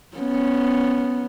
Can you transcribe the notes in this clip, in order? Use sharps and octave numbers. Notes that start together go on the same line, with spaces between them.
B3 C#4